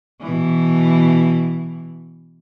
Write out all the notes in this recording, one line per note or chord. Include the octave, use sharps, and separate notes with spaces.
B2 E3